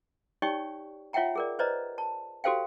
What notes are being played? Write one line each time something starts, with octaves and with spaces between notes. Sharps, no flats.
D#4 G4 C#5 D5 G5 C#6
F4 C#5 E5 F#5 G5 A#5
G#4 A#4 D5
B4 C5 D5 D#5 A#5
A5
F#4 G4 A4 C5 F5 G5